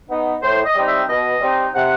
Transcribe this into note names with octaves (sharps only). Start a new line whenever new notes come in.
B3 D#4
A2 C5
D#5
G3 C4 D#4
E5
B2 D#5
G3 C4 D#4
C3 F#5